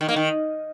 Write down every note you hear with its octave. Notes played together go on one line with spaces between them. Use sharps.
D#3
A#3
D#3